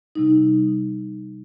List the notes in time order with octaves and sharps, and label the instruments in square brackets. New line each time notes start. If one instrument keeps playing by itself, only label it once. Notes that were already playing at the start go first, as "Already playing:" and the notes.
[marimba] C3 G3 D#4